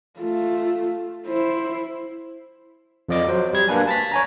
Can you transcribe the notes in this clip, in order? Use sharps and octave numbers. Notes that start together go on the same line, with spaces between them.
A3 F4
E4 C5
F2 F3 D5 D#5 D6
F#3 C5
G3 G#6
A#3 D4 B4 G#5
A5 A6 B6
C#5 G#5 A#5